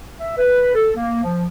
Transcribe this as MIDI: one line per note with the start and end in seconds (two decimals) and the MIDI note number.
0.20 0.37 76
0.38 0.71 71
0.75 0.91 69
0.96 1.23 58
1.24 1.44 53